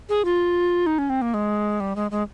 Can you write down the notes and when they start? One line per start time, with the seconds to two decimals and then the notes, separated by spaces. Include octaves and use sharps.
0.09 G#4
0.25 F4
0.86 D#4
0.99 C#4
1.10 C4
1.22 A#3
1.34 G#3
1.80 G3
1.96 G#3
2.11 G#3